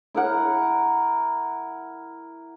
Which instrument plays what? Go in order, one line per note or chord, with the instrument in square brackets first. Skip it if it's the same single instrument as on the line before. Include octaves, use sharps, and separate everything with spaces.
[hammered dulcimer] E4 A#4 F#5